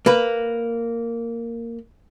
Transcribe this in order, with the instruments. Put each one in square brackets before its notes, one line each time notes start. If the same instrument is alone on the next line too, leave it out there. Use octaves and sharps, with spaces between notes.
[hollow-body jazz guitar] A#3 B4